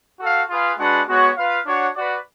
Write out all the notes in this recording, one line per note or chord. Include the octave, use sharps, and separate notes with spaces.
F#4 A4 F5
F4 G#4 B4 F5
G#3 D4 F#4 B4 F#5
G#3 B3 F#4 C#5 F#5
F4 B4 F5
D4 F#4 C#5 F#5
F#4 B4 D5